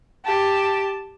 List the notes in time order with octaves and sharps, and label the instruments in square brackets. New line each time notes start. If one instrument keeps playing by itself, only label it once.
[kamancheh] G4 A5